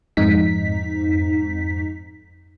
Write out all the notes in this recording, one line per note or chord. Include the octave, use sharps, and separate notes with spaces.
F2 G#2 D#4 B6